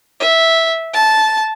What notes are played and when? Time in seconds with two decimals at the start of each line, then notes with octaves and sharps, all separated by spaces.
0.20 E5
0.94 A5